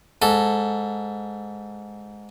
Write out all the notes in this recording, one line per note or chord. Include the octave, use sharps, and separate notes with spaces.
G#2 A4